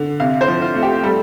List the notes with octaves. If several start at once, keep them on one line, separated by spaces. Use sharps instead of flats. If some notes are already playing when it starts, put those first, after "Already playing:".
Already playing: D3
C3 F5
C5
F3
F4
A3
G4
G3 A4